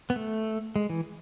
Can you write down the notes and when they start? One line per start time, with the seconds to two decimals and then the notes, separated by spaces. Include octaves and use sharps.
0.10 B3
0.16 A3
0.76 G#3
0.90 E3